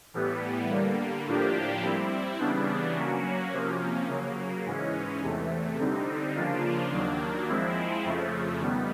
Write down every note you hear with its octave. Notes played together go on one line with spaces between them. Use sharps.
A2 E3 G3 B3
D3 G3 A#3
A2 F3 A#3 D4 G4
G3 C4 E4
C#3 E3 G3 B3 D4
F#3 A#3 C#4 F#4
C3 F3 A#3 C#4
C#3 F#3 A#3
G#2 E3 G#3 C#4
E2 C3 E3 A3
D3 G3 C4 D#4
C#3 F3 A#3 D4 F4
D#2 D#3 F#3 A#3 D4
F3 G#3 C4 E4
F2 C#3 F3 A3
D#3 G3 B3